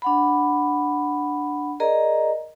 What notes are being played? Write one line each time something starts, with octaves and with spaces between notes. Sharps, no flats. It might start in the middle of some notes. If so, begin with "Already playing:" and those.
D4 F#5 B5
G#4 A#4 D5 D#5 A#5